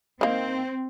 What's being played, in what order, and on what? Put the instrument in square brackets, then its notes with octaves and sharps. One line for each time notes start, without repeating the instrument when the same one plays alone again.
[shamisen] D#3 A#3 [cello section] C4